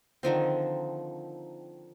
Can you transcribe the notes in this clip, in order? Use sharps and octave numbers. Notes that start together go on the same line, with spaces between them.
D3 D#3 F3 C4